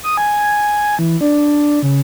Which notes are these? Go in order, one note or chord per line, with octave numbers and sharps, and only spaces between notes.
D#6
G#5
E3
D4
C#3